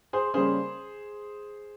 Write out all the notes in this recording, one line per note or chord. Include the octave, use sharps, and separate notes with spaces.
G#4 C5
C#3 G3 A#3 C#4 G#4 C5